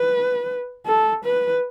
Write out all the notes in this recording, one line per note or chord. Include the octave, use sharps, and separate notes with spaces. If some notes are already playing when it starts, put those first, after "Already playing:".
Already playing: B4
A4
B4